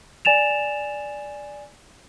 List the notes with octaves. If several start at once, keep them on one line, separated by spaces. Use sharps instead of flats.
D5 G#5 A6 E7 F7